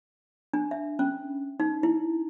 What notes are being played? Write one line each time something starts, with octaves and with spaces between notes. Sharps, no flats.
D4
E5
C#4
D#4
E4